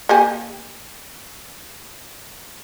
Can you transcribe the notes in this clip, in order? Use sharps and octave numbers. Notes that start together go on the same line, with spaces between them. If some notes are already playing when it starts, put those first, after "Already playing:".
A#3 G4 G#5